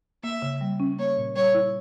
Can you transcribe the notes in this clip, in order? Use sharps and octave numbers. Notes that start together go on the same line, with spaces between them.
A#3 E5
C#3
G3
C#4
A#3 C#5
A#2
G3 C#5
E4